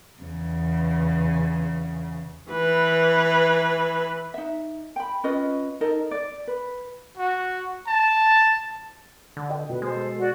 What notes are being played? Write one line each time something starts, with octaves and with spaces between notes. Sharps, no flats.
E2 C#3
E3 B4
D#4 E5
G5 B5
C#4 F4 B4 D#5
D#4 A4 A#4 D#5
D5
B4
F#4
A5
D3
D#5 G5
B2 B4
G#3 A4 C5
F#4 D5 F#5